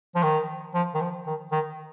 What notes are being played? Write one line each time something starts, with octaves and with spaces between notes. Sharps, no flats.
F3
D#3
F3
D#3
F3
D#3
D#3